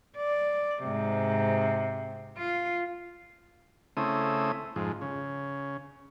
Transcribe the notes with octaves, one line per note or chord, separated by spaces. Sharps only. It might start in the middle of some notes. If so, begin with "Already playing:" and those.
D5
G#2 C3
F4
C#3 A3 C4 E4 D#6
F2 G#2
C#3